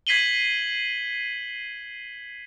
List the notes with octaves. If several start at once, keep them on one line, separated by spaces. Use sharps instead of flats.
G#6 B6 C7 D#7 F#7 G7